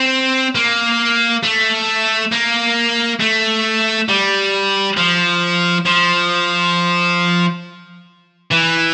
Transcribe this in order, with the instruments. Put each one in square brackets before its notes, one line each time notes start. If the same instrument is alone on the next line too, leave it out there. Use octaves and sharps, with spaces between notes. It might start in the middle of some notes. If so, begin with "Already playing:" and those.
Already playing: [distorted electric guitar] C4
A#3
A3
A#3
A3
G3
F3
F3
E3